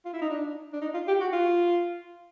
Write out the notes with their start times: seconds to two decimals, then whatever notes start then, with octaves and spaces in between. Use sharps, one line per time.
0.05 F4
0.13 E4
0.22 D#4
0.30 D4
0.73 D4
0.82 D#4
0.94 F4
1.08 G4
1.21 F#4
1.33 F4